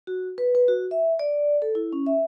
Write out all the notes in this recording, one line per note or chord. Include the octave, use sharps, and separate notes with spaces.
F#4
B4
B4
F#4
E5
D5
A4
E4
C#4
E5